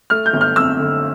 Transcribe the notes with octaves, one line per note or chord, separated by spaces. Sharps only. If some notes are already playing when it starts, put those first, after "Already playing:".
A3 F6
G6
G1
F6
F2 E6
D3